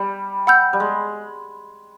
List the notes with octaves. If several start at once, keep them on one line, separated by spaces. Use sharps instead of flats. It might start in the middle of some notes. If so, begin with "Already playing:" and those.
Already playing: G3
F#5 B5 E6 G6
G3
G#3